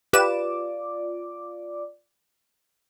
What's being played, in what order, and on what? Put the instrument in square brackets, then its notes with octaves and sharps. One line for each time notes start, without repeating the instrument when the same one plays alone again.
[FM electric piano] F4 D5 D6 [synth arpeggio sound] G4 B4 E7